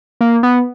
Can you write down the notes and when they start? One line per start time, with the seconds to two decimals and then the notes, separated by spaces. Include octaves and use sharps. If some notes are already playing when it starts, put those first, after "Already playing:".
0.21 A#3
0.43 B3